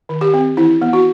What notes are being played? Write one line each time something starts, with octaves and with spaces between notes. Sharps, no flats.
D#3
G4
C4
E3 E4
B3
F#4